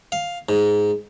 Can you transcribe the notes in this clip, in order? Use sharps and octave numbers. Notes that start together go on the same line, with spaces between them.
F5
G#2